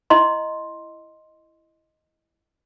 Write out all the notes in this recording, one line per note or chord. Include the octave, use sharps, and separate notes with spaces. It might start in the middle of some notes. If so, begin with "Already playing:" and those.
E4 D#5 C6